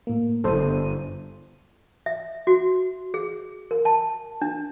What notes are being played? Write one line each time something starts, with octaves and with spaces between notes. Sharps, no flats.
A2 A#3
G1 A4 C5 D#7
E5
F#4
G#4
A#4
A5
D4